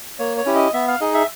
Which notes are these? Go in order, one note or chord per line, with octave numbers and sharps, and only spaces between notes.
A#3 C#5
C#5
C#4 E4 G4
D#5
B3 E5
F5
D#4 G#4 D#5
E5